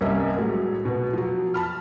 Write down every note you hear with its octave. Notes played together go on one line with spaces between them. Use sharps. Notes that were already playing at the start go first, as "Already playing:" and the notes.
C2 G2 C#4 A#4 D#5 E5
A2 F#3 G#3
B2 B3
F3 F#3
A5 B5 F6